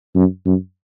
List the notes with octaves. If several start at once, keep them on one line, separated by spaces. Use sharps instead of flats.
F#2
F#2